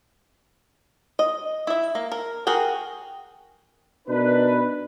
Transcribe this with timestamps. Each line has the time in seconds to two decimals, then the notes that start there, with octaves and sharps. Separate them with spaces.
1.19 D#5
1.67 E4 E5
1.95 A#3
2.12 A#4
2.47 F#4 G#4 A#4 F#5 G5
4.08 B2 D4 D#4 A#4 B4